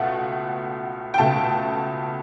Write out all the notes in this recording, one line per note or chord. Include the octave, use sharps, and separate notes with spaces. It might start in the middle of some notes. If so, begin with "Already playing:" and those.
Already playing: C#2 B2 A3 F#5
G5
C#2 B2 A3 A5